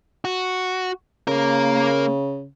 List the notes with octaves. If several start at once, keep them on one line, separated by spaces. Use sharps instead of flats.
F#4
C#3 A#3 A#4